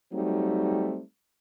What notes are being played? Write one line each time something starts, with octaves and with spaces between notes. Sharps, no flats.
F#3 G3 A3 C4 D#4